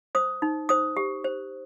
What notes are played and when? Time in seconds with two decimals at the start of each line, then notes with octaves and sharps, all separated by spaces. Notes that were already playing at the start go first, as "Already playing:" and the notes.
0.15 C5 D#6
0.42 D#4
0.69 C5 D#6
0.97 G4
1.24 C5